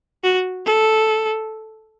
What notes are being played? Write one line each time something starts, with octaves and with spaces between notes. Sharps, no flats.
F#4
A4